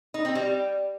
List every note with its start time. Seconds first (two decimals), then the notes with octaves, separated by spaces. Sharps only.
0.14 D#4
0.25 C4
0.35 G3